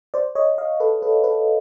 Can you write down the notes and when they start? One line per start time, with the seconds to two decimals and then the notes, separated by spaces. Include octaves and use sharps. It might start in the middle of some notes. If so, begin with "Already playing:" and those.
0.14 C5 D5
0.35 C#5 D#5
0.58 D#5 F5
0.80 A4 B4
1.02 A4 B4
1.24 A4 B4